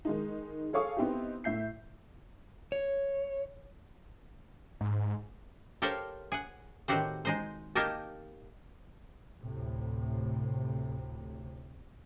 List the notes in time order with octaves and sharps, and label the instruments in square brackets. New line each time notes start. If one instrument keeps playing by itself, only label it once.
[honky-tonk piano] D#3 G#3 D#4
G#4 A4 C#5 F5 C#6 D#6
B3 C4 D#4 E4 G4
A2 E5 G6 C7
[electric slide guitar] C#5
[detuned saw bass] G#2
[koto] G4 A4 A#4 C5 C#5 F5
G#4 F#5
A2 D#3 C4 F#4 G4 C5
G#3 D#4 C5
A#3 D#4 G4 A#4 D#5 A5
[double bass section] D2 A2 C3